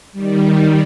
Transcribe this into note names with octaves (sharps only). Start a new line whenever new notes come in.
D#3 G3